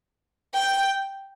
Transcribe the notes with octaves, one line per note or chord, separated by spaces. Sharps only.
G5